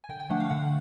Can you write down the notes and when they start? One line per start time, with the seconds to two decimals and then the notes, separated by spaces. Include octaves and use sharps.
0.04 G#5
0.09 D3 G5
0.20 G5
0.30 F3 A3 D4 F#5
0.40 F5
0.50 D3 F#5